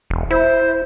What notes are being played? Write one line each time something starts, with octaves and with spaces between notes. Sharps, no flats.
E1
E4 C5